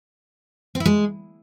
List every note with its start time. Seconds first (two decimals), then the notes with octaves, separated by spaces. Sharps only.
0.75 C4
0.80 E4
0.86 G#3